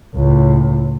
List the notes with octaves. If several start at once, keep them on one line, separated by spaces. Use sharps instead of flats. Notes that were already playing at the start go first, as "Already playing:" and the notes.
C#2 A2